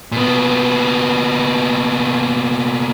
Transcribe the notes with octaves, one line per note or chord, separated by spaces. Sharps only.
A#2 B3